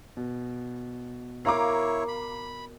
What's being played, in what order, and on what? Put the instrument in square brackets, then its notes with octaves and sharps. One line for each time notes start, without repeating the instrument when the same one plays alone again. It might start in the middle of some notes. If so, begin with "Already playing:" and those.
[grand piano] B2
[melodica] E4 C#5 [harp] A#4 [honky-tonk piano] F5 A#5 D6
[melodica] B5